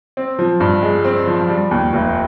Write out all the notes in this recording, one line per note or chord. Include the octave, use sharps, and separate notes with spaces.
C4
F3
G2
G#3
C4
F3
G3
D#2
F1